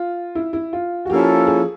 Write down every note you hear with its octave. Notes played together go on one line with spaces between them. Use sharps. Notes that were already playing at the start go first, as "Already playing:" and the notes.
Already playing: F4
E4
E4
F4
F#4
F3 A#3 C#4 E4 G4 A4
G#4